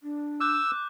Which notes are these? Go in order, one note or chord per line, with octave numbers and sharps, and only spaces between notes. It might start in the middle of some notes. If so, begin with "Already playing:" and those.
D4
D6 E6 F#6 G6